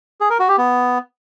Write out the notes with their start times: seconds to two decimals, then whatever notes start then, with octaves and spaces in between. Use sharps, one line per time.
0.21 G#4
0.30 A#4
0.39 F#4
0.49 G4
0.58 B3